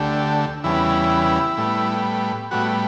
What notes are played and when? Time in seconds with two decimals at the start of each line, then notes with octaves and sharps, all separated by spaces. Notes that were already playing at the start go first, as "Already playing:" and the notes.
Already playing: D2 D3 A3 G4
0.64 E2 C#3 G3 B3 E4
1.57 A2 G3 B3
2.51 A2 G3 B3 F#4